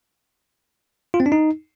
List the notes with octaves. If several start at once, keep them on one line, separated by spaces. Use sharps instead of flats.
F4
C4
D4
D#4